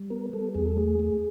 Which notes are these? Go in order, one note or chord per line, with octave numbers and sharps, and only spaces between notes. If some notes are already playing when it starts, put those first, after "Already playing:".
Already playing: G3
B3 A#4
G3 A4
E2 G#4
A4
A3 G#4
A3